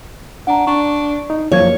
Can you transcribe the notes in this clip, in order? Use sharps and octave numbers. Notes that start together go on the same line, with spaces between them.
D4 F#5 A#5
D4 C#6
D#4
F#2 F3 A#3 C#5 G#6